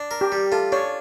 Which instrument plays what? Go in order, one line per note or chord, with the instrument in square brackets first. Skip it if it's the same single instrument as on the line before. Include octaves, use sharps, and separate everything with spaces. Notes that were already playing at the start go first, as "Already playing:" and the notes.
Already playing: [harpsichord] D4
A#4
[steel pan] G4
[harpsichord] G3
[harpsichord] F4 [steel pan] A4
[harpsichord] D4 [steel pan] C#5